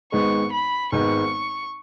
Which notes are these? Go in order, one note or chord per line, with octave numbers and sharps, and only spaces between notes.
G#1 G#2 G#3 B3 C#6
B5
G#1 G#2 G#3 B3 C#6